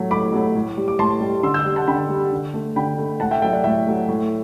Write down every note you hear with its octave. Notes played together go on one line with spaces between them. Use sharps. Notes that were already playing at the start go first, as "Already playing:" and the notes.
Already playing: A2 F#3 A3
A2 B5 D6
F#3 A3
A2
G3
D6
A2 A5 C6
G3
D3 C6 E6
E6 G6
G3
F#5 A5
D3 G5 B5
G3
D3
A3
D3 G5 B5
A3
A2 F#5 A5
E5 G5
F#3 A3 E5 G5
D5 F#5
A2 E5 G5
F#3 A3
A2